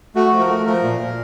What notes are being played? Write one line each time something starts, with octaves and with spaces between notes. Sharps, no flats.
A3 F#4
F3
A#4
A3
F3 A#4
A#2
A#2